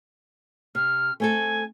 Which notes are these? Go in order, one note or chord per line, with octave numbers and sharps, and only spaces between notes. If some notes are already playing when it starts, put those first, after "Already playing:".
C3 F6
A3 C4 A4 G#5